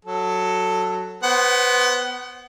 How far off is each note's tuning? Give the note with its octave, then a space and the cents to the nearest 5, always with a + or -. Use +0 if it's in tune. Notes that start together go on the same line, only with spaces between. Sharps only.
F#3 +0 A4 +10
B3 +0 C5 +5 F#5 +35